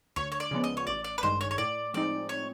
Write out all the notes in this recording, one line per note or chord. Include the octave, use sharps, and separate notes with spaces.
D2 C#5
C#5
D5
C#3 F3 G#3 B3
D#5
C#5
A1 D5
D5
B4
G2 D#3 G#3 C5
C#5
C#5
A2 D5
F3 G#3 C4 D#4 D5
C#5